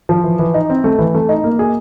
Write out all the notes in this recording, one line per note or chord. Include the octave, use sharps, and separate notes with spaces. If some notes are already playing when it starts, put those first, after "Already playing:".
F3
E3
E3
D#4
C4
A3
E3
A3
D#4
A#3
G#4